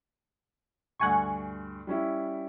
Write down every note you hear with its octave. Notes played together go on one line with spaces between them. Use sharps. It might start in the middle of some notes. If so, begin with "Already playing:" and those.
D2 G2 F#5 G#5 C#6
G3 C#4 E4